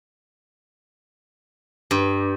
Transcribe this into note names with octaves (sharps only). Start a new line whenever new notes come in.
G2